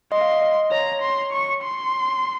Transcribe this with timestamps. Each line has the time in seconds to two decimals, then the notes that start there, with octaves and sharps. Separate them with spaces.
0.12 D#5 C6
0.21 F5
0.32 D#5
0.42 D#5
0.71 C#5 A#5
1.02 C6
1.32 C#6
1.63 C6